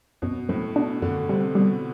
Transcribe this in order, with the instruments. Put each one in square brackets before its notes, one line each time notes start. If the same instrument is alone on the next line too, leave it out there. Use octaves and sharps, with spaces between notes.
[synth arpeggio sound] F#2 [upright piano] B2
[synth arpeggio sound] F#2 [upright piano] A2
[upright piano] B2 [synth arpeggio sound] D4
[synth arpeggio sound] F#2 [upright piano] D3
[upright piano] C3 [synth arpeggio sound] G3
[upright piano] B2 [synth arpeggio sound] G3